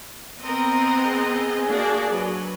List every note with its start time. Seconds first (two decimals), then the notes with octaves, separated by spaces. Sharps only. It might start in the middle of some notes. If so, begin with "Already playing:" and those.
0.41 B3 C4 A#4 D#5
1.02 G#4
1.68 A#3 D4 F#4 D5
2.10 F#3 B4